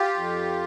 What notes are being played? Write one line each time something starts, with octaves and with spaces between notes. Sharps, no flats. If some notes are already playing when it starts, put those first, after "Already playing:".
Already playing: F4 G4
F2